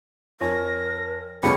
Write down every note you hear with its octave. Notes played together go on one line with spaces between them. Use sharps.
F2 A#4 C#5 G#5 A#6
B1 F2 C#3 G3 B3 C#4 A4 C#7